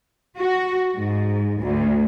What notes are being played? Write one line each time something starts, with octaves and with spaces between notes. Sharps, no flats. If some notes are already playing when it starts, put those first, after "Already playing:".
F#4
G#2
D2